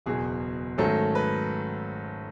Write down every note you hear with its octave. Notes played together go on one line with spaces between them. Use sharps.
F#1 E2 B2 G#4
G#2 D#3 F#3 A3 C#4 A4
B4